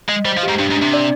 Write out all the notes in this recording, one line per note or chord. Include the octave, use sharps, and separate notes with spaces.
G#3 D#5
G3 C5
F3
G4
G#2
G2 D4
G#2
D4
C3
D5